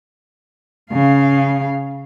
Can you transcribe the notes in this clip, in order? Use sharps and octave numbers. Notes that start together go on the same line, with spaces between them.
C#3 F5